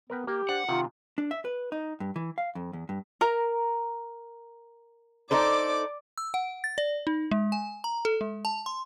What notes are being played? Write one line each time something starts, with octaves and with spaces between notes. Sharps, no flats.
B3 A#4 B4 G5
A#3 G4
D4 C5 F#5
C3 D#3 F4
D4
E5
B4
D#4
G2
E3
F5
F2
E2
G2
A#4 A#5
D#4 A4 C5 D5 D6
E6
F#5
A6
D5
D#4
G#3
G#5
A#5
A4
G#3
A5
C6